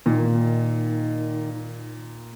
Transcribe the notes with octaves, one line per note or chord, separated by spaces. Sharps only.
A#2 D#3